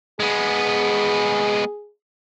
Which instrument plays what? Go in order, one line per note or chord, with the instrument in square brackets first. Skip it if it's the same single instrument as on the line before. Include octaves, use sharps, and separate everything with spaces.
[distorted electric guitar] G#3 B3 [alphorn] G#4